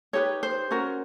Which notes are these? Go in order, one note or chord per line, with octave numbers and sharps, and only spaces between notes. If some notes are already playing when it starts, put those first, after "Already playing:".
D#4 G4 B4 C#5
C5
C#4 F#4 A#4